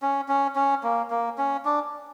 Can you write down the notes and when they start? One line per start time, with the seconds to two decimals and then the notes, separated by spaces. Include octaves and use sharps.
0.02 C#4
0.28 C#4
0.56 C#4
0.83 A#3
1.10 A#3
1.38 C#4
1.65 D4